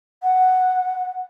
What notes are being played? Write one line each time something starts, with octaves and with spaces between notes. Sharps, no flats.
F#5